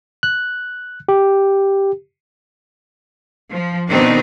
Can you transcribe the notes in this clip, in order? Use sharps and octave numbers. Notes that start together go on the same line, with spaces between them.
F#6
G4
F3
B2 D#3 C4 D4 D#4